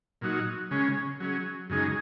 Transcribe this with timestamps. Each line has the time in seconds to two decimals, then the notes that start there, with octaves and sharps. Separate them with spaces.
0.21 A#2 F#3 D#4 F#4
0.71 C#3 G#3 C#4
1.20 F#3 C#4 G#4
1.70 F#2 C#3 G#3 D#4 G#4